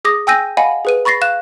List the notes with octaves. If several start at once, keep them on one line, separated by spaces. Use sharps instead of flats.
G#4 D6 D#6 A#6
G5 G#5 E6 G6 A#6 D#7
D#5 F5 F#5 G#5 B5
G#4 B4 D#7
B5 C#6 A6 A#6 C7
F5 F#6 E7